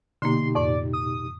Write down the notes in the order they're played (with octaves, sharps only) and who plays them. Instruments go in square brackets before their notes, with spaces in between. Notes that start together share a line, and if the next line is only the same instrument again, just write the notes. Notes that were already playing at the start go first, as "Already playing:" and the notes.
[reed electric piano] B2 D#4 G4 [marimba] D3 A#3 [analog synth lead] C6
[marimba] F2 A2 [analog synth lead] D5
[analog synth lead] D#6